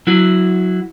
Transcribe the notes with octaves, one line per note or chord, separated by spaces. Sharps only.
F#3 E4 F#4